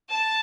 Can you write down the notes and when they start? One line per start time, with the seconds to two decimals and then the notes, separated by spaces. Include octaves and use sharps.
0.10 A5